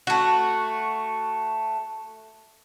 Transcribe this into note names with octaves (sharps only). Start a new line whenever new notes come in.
A3 F#4